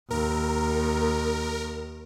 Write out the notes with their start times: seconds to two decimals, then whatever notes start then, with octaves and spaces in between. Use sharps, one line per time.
0.10 D#2 A#4